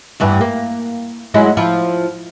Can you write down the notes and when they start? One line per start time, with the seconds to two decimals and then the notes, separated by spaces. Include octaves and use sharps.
0.20 E2 G2 E3
0.41 A#3
1.34 F#3 G#3 E4
1.57 F3 E4